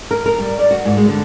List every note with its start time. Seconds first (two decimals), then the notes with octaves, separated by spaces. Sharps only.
0.11 A#4
0.26 A#4
0.39 G3
0.59 D5
0.71 F#4
0.85 G#2
0.97 G#3
1.09 D3